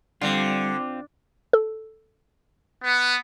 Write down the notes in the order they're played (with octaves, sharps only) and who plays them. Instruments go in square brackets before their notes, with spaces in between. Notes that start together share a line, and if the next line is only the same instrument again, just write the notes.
[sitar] D3 [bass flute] G3 [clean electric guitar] C4 F4
[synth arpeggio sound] A4
[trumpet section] B3